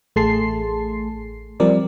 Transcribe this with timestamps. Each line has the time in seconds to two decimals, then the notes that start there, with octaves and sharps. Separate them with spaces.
0.16 A1 A3 G#4 A5 C6 C7
1.60 F3 G3 C4 A#4 D5